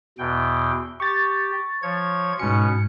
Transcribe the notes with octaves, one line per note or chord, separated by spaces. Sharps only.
E2 B2 G5
G4 C#6 A6
F3 C#5 G#6
G#2 B2 C#4 C#7